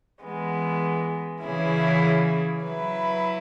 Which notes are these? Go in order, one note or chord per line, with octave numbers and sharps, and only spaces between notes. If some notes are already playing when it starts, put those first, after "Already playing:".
E3 G#3 B3
C#3 E3 C#4 E4 G#4
F#3 E4 B4